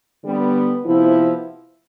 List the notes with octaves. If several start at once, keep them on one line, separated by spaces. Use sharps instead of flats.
D3 G3 B3
C3 F3 B3 E4